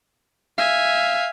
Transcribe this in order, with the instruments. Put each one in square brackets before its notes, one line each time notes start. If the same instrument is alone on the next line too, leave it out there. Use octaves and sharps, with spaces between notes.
[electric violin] E5 G#5 [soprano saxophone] F5